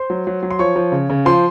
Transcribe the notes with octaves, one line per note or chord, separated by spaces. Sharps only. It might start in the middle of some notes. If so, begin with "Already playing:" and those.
Already playing: C5 C6
F#3
F#3
F#3
C6
F3 C#5 C#6
F3
C#3
C#3
F3 C5 C6